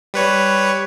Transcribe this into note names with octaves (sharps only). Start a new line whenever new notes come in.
G3 B4 C#5